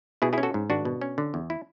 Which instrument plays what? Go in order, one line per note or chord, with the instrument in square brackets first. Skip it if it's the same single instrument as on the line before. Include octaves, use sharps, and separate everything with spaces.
[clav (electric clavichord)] B2 E4 G#4
E4 G#4
C#4
F#4 A4
G#2
G#1 D4 F#4
B2
C#4
D3
E2
E4